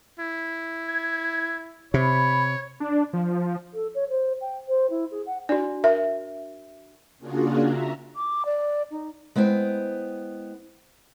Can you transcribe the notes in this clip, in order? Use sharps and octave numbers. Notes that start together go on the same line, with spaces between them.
E4
G#6
C3 C#5 B5
D4
F3
A4
C#5
C5
G5
C5
E4
G#4
F#5
D4 F#4 D5
A#4 E5
C#3 A#3 D4 F4 F#4 G#4
E5 A#5
D6
D5
D#4
G#3 B3 E4 C5 G5